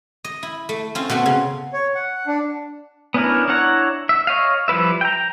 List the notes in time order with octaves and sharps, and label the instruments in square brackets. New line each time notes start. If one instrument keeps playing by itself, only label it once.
[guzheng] D#5
E4
A3
C4 C#4 F4
B2 A3 C4 F#4
C#3
[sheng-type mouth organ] C#5
F#5
D4
[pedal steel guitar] B3 C#4 D4 E4 A#4
D4 E4 C#5 F#5 A#5
E5
C#5 D#5 F5
F3 G3 E4 B4 E5
G5 A#5